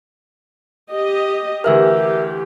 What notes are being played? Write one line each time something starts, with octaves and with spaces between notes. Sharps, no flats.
G4 D#5
D2 E3 G4 A#4 E5 E6 F6